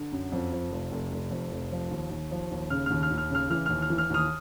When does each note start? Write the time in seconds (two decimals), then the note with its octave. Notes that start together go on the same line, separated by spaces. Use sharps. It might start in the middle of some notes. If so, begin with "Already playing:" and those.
Already playing: D3
0.12 F#2
0.32 F2
0.52 F3
0.71 F1
0.92 F1
1.11 F1
1.31 F2
1.52 F1
1.72 F3
1.90 D#2
2.10 D#2
2.31 F3
2.51 D#2
2.70 C#3 F6
2.86 F6
2.90 D#2
3.03 F6
3.11 D#2
3.18 F6
3.30 C#3 F6
3.50 E3 F6
3.66 F6
3.69 D#2
3.82 F6
3.90 E3
3.98 F6
4.10 D#2 D#6 F6